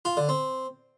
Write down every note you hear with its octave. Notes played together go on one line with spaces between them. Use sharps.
F4
D3
C4